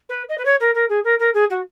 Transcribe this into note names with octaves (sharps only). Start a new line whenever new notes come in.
B4
D#5
B4
C#5
A#4
A#4
G#4
A#4
A#4
G#4
F#4